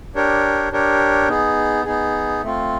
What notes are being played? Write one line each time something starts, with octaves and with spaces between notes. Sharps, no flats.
D4 G4 A#4 C#5
D4 G4 A#4 C#5
B3 D#4 G#4
B3 D#4 G#4
A3 C4 F4